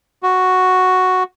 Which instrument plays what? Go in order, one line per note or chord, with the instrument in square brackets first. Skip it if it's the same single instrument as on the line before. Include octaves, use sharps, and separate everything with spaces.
[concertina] F#4